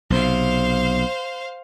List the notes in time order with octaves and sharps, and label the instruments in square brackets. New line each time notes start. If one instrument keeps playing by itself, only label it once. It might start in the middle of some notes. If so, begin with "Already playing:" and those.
[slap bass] B1 C3 [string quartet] C5 F5